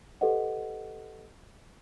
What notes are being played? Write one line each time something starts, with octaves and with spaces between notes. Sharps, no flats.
G4 A4 B4 C5 D#5 F#5